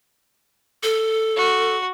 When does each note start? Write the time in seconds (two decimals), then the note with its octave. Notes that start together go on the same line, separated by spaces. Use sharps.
0.83 A4
1.36 F#4